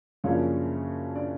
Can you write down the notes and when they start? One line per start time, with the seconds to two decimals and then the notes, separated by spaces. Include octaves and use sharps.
0.24 F#2 C#3 F3 A#3 C#4 D4 C#5
1.16 D4 D5